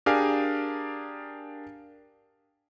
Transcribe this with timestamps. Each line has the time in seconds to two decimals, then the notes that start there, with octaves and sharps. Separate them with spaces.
0.06 D4 G4 G#4 A#4 F5 G#5